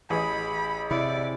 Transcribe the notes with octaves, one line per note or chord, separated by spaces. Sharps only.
A1 G#4 D#5 B5
C3 E4 D5